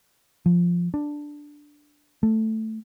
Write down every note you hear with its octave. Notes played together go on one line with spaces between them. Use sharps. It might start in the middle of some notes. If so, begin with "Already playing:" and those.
F3
D4
A3